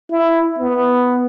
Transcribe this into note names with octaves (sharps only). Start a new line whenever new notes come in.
E4
B3